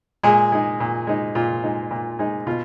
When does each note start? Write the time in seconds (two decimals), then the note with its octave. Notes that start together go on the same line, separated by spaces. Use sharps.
0.23 A#2 G#3 G#4
0.52 G#3 D#4
0.80 A#2
1.07 G#3 D#4
1.35 A#2 F4
1.63 G#3 D#4
1.91 A#2
2.19 G#3 D#4
2.47 B2 F4